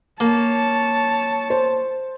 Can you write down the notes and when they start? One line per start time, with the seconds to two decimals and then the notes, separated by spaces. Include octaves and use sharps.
0.20 A#3 C#5 A5
1.50 C5